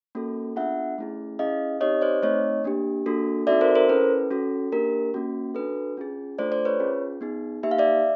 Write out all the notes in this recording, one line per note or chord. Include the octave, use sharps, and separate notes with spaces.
A#3 C#4 F#4 A4
B3 D4 F4 G#4 E5 F#5
A3 C#4 E4 G#4
C#4 E4 G#4 D#5 F5
C4 D#4 G4 C#5 D#5
C5 D5
A3 C4 D#4 C#5 D#5
A#3 D4 G4
A#3 D4 F#4 A4
C4 D#4 F#4 A4 D5 E5
A#4 C5
A#4 C5
C#4 E4 A4 B4
C#4 F#4 A4
A#3 D4 G4 A#4
A#3 C#4 F#4
D4 F#4 A4 B4
C#4 F4 G#4
A3 D4 F4 A4 C5 D5
C5 D5
B4 C#5
C#4 F4 G#4
B3 D#4 G#4
A#3 D#4 G4 E5
F5
D5 E5